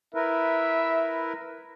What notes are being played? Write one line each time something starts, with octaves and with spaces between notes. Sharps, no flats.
E4 A#4 B4 E5